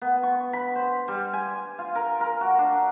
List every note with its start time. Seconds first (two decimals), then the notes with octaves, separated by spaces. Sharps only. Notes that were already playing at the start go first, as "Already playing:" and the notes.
0.02 B3
0.23 C#6
0.53 B5
0.75 C5
1.08 G3
1.33 G#5
1.78 F4
1.95 A#4
2.21 A#4
2.41 F#4
2.58 D4